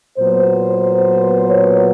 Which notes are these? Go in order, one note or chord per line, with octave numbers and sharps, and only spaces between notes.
A#2 F#3 B3 C5
C#5